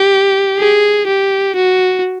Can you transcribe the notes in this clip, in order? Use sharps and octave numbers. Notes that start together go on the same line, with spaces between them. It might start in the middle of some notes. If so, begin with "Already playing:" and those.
Already playing: G4
G#4
G4
F#4